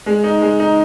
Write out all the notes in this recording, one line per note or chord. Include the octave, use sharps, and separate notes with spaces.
G#3
D#4
G#3
D#4